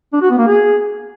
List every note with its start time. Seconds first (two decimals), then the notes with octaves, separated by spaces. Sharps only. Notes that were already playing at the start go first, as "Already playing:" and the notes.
0.13 D4
0.22 F#4
0.30 B3
0.39 A#3
0.47 G#4